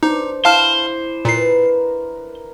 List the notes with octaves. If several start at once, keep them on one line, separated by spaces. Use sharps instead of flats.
D4 D#4 C5 D6
E4 C5 F5 A5 F6
A#2 A#4 B4 B5 C7